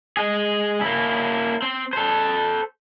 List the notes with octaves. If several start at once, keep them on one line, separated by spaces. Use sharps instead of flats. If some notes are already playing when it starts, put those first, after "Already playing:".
G#3 G#4
A#3 E4
C4
A4 C5